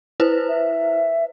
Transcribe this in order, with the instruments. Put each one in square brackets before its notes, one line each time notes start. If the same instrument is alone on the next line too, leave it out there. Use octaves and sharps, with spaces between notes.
[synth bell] E4 B4 C5
[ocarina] E5